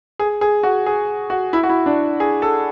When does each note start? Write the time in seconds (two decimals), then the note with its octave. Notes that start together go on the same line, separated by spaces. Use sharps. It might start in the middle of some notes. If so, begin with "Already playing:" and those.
0.19 G#4
0.41 G#4
0.63 F#4
0.86 G#4
1.30 F#4
1.53 E4
1.63 F#4
1.69 E4
1.86 D4
2.20 G#4
2.42 A4